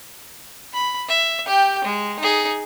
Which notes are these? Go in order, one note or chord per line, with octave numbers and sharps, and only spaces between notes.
B5
E5
G4 G5
G#3
D#4 G#4